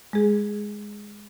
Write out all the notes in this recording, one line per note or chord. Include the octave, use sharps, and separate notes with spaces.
G#3 G#4